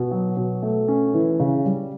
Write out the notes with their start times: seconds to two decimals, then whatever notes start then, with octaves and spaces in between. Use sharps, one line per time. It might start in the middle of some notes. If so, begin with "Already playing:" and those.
Already playing: B2
0.11 F#3
0.37 B2
0.62 A3
0.88 C#4
1.14 E3
1.40 C#3
1.65 G3